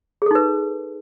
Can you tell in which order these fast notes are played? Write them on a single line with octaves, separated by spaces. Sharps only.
G#4 A4 D#4 B4